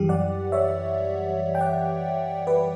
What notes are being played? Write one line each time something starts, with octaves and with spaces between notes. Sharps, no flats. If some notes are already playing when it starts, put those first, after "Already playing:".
Already playing: F#2 E3 G3 G4
D5 F#5
C#5 E5
G5
D5 F#5
B4 D5